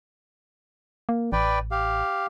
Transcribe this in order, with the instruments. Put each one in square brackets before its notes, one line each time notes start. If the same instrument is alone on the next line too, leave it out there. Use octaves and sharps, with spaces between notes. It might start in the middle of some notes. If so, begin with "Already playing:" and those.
[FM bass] A#3
[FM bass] A1 [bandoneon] B4 D5 G5
[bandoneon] G4 F5